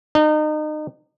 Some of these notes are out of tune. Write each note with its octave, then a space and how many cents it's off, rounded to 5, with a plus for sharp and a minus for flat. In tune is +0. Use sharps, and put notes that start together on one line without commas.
D#4 -30